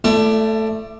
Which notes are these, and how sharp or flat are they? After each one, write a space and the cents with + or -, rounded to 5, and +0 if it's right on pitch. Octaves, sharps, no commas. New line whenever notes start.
A3 +0 E4 +40 D5 +10